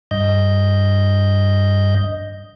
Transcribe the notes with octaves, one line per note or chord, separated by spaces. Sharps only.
G2 D#5 G6